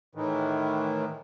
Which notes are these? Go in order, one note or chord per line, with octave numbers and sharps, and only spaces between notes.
A2 D#3 E3